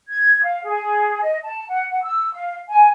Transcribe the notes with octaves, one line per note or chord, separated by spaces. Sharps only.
G#6
F5
G#4
D#5
A5
F#5
F#5
E6
F5
G#5